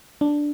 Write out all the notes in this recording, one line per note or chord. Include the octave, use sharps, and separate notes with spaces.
D4